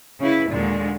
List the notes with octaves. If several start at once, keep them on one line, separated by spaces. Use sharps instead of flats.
C#3 E4 B4
D#2 A#2 D3 G#3